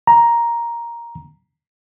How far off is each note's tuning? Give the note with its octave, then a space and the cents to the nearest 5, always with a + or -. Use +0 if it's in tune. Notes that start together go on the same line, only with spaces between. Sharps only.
A#5 +10